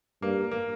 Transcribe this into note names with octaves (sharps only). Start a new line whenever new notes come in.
G2 A#3
A#3